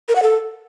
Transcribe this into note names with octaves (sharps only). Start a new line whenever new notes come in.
A#4
F#5
A4